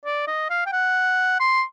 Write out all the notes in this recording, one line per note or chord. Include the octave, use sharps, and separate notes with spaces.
D5
D#5
F5
G5
F#5
C6